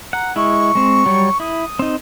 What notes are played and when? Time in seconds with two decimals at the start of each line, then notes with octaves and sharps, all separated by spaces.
0.13 F#5 A#5
0.36 G#3 E4 C#6
0.75 G#3 C4
1.05 F#3 G3 C#5
1.40 E4 D#6
1.79 C4 D#4